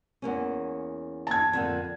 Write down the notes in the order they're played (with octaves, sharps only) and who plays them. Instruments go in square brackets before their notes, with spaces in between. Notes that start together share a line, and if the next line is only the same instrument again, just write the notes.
[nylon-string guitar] E2 A#3 C#4
[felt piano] A5 G#6
[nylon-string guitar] F2 D3 A#3